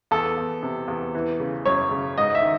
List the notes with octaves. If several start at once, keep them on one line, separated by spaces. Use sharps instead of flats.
E2 A4
E2
C3
E2
E3
C#3
F#2 C#5
C#3
G#2 D#5
E5
D#3